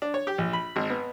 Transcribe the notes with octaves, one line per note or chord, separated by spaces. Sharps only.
D4
C#5
G4
A#1
B5
G#1
B3